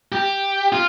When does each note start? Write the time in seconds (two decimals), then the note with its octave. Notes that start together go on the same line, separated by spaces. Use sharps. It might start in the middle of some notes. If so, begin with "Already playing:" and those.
0.12 G4
0.73 F4